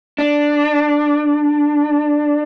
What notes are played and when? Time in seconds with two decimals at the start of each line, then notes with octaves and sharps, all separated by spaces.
0.19 D4